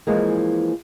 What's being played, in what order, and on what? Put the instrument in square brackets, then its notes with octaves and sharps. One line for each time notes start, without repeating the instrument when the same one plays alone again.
[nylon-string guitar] E3 F3 G#3 A#3